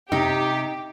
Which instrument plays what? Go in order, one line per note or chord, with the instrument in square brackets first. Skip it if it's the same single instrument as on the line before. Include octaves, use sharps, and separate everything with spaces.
[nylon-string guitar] C3 [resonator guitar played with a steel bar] D#4 [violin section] G4